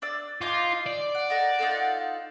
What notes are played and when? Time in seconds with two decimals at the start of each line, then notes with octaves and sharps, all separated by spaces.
0.02 D4 D5 E6
0.41 D#4 F4 G#5 D6
0.86 D5
1.15 F#5
1.30 D#4 A4 A#4 F#5
1.59 D#4 F4 A4